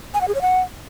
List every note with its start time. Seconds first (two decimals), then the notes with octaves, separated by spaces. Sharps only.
0.14 G#5
0.21 F#5
0.28 G#4
0.35 C#5
0.41 F#5